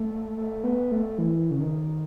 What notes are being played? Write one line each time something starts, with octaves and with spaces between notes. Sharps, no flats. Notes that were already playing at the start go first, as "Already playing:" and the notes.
Already playing: A3
A3
B3
A3
E3
C#3
D#3